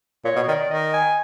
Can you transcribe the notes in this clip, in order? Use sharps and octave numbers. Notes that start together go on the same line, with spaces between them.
A#2 C#5
B2
D#3 D5
D#3 D#5
G#5